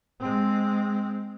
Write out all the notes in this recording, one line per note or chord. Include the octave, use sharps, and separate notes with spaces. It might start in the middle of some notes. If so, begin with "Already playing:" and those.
G#3 C4